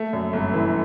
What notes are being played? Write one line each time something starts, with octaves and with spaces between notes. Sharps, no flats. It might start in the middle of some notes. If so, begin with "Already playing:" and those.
Already playing: A3
F#2
G1
E3